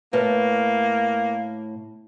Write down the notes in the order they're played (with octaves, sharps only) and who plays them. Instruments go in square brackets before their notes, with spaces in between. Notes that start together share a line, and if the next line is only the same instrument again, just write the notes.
[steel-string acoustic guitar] A2 [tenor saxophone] A#3 [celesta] B4